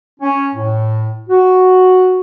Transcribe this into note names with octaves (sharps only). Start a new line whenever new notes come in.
C#4
A2
F#4